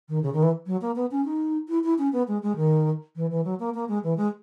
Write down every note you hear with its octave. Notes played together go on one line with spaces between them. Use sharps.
D#3
C#3
D#3
E3
F#3
A#3
B3
C#4
D#4
E4
E4
C#4
B3
G#3
G#3
D#3
E3
E3
F#3
A#3
A#3
G#3
E3
G#3